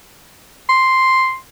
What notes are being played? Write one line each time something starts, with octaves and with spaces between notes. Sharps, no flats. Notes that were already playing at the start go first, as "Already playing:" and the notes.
C6